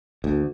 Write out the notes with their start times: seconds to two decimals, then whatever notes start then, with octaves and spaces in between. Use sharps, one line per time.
0.24 D2